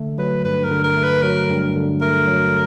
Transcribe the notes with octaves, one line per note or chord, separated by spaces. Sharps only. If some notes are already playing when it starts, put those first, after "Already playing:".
Already playing: D3 A3
F#3 B4
G2 B4
A#4
D3
A#4
A3
B4
F#3 A#4
G2
D3
A3 A#4
F#3